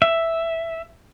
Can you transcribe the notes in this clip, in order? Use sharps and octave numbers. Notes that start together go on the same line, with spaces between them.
E5